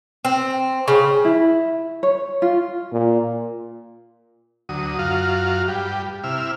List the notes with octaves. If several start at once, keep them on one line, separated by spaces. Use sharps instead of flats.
C4
C#3
E4
C#5
F4
A#2
D2 F#3 D#6
F#2 F4 F#4 F5
G2 G4
C3 E4 E6 F6